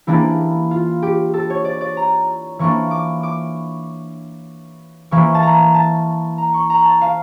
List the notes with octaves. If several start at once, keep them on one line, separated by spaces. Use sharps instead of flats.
E3 G3 A#3 D4 E4
F4
G4
A4
C#5
D5
D5
A#5
E3 A#3 D4 C#6
D6
D6
E3 A#3 E4 C#6
A5
A#5
A5
A#5
C#6
A#5
A5
F5